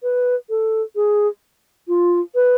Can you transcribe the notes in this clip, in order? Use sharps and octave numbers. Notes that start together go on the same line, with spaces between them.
B4
A4
G#4
F4
B4